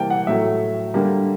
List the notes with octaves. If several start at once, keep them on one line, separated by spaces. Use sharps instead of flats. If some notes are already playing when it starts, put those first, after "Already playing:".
Already playing: C3 E3 G3 A#3 G5 A5
F#5
A2 F#3 A3 E5
D3 G3 A#3